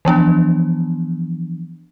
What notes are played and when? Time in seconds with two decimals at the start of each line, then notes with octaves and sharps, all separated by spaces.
0.05 E3 F3 B3 D4